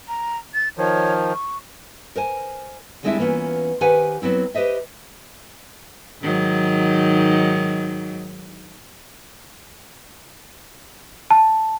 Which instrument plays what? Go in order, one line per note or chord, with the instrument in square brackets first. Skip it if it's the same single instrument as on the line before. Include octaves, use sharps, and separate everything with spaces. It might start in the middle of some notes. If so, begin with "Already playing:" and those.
[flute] A#5
A6
[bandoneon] D#3 F3 [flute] C#5
[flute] C#6
[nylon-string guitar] A#4 C5 G#5
D3 G3 G#3 C4 D4 E4
E3 A#3 B3 C#4 F4
D#3 G4 B4 C5 F#5 G#5
F#3 B3 C4 E4
G4 B4 C5 D#5 E5
[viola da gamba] G#2 D#3 F#3
[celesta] A5